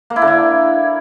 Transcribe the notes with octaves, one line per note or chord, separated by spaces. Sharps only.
A#3
E4
D3
E4